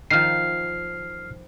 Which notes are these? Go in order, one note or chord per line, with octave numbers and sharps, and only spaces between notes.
D#3 F3 F6 C7